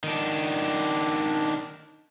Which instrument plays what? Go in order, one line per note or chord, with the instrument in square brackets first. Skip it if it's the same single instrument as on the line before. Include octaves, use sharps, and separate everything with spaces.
[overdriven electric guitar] D#3 D4